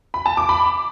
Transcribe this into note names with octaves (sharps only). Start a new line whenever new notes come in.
B5
A5
D6
B5